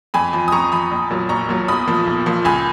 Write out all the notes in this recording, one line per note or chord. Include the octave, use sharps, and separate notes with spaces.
F2 G#5 B5
F3
D#6
F2 A#5 C#6
F3 B5 D#6
A#1
A#2 F#3
A#1 A#5 C#6
A#2 F#3
B1 B5 D#6
A#2 F3
B1
A#2 F3
C#2 G#5 B5